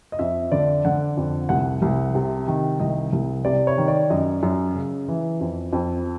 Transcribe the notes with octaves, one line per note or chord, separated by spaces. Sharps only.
D#5
F2 E5
D3 D5
D3 F#5
F2
C2 F#5
C2
C3
D#3
C2 D#5
C2
C3 D5
C#5
D#3
D5
F#2 D#5
F#2
C#3
E3
F2
F2